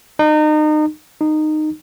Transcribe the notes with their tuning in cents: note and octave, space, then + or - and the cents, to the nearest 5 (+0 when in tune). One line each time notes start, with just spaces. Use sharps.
D#4 -30
D#4 -15